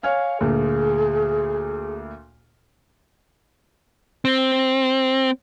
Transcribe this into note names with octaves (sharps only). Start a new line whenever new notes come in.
C#5 F5 G#5 F6
D2 A#2 G#4
C4